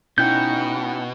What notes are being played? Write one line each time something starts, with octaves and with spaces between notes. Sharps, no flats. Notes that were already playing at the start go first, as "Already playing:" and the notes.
B2 C#4 D#4 E4 F#5 G5 G6